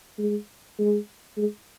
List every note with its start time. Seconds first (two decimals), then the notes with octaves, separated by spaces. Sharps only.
0.18 G#3
0.79 G#3
1.37 G#3